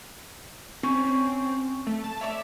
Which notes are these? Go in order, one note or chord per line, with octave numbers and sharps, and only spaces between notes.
C4 C#4
A3
A5
C#5 D5 E5 D6